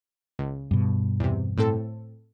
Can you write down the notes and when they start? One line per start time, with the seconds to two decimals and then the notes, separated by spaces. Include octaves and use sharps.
0.39 C#2
0.71 G2 B2
1.20 E2 C3
1.58 A2 C4 A4